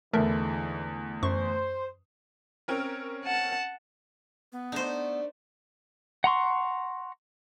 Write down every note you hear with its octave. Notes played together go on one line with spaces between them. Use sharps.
E2 G#2 D3 E3 A3 A#4 E5
F#2 C5 C#6
C4 C#4 A#4
F#5 A5
B3
A3 D4 D#4 C5
F#5 A#5 C6 C#6